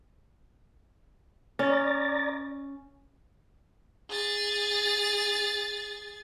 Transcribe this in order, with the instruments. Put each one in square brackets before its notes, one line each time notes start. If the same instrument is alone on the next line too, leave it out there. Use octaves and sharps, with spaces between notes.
[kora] C#4 [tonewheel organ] D5 A#5 A6
[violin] G#4 A6